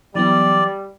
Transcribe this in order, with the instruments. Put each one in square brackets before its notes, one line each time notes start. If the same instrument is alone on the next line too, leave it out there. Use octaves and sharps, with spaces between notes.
[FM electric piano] E3 F#3 B3 [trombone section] G3 [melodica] D5